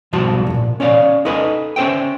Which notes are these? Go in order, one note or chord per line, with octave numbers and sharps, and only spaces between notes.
B1 G#2 F3 G3 F#4 A5
G2 A#2
C#4 C#5 D5 F5
D#4 A4 B4 D#5 G#5
C#4 C5 E5 G5